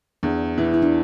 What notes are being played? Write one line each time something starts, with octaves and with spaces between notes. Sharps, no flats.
E2 D4
E3
E4
D4